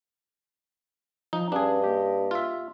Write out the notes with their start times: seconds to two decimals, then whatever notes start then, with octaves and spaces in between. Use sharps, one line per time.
1.33 F3 D#4
1.52 G2 C#4 D4 G#4 B4
1.82 A#3 G4 D#5
2.31 F4 E5